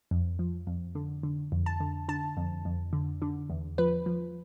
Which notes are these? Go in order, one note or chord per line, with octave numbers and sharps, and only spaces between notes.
F2
F3
F2
D3
D3
F2
A5
D3
D3 A5
F2
F2
D3
D3
E2
F3 B4
F3